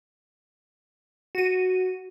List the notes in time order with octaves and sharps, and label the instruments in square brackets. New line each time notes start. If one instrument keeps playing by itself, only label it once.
[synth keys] F#4 D#7